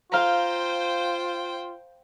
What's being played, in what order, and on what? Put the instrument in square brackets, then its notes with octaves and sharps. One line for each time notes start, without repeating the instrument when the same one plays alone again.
[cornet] F4 [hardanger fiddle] C5 G5 [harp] F5 A#5